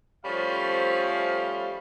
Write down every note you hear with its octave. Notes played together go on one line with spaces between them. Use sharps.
F3 G3 A3 C#4 C5 F5